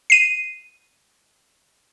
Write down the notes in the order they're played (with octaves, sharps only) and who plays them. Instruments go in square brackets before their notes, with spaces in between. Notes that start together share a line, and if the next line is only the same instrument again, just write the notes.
[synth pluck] C7 D#7